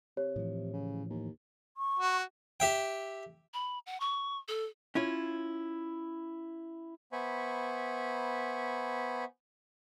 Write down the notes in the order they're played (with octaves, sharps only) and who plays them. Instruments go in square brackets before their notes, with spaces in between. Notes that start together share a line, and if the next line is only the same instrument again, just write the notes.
[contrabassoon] C3 [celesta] G4 C#5
[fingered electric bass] A2 E3 F3
[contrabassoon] C#3
D#2
[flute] C#6
[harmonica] F#4
[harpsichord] G4 E5 G5
[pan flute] B5
F#5
C#6
A4
[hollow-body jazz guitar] C#4 E4 F4
[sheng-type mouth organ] B3 C5 E5 G#5 B5 C#6